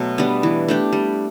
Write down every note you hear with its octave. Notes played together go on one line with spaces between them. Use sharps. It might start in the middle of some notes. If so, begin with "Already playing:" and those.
Already playing: B2 F#3 A3
G3 B3 D4
E3
A3 D4 G4
G3